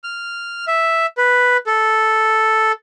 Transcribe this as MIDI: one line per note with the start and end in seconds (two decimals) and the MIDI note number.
0.04 0.65 89
0.67 1.06 76
1.18 1.57 71
1.67 2.72 69